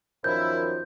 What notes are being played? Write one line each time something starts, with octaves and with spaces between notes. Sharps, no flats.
F#2 D#3 F3 E4 G6